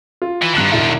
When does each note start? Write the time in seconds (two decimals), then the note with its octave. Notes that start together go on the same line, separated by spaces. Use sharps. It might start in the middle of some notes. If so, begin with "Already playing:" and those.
0.22 F4
0.42 E3
0.55 G2 D3 D#3 F#6 F#7
0.72 E1 E4